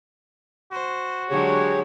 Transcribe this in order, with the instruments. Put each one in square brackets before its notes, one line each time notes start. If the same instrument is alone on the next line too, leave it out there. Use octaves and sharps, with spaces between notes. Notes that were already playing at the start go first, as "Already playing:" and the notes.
[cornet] F#4 [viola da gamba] C5
[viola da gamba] D3 F#3 G#3 [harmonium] G4 G#4 C#5